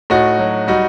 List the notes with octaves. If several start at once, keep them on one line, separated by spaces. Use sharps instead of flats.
A2 D#4 F#4
F#3
G3 D#4 F#4